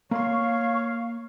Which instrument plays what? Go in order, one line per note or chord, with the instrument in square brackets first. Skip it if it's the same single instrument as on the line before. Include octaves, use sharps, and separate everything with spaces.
[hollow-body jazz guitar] A#3 C6 [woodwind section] C#5 F5 [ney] C#6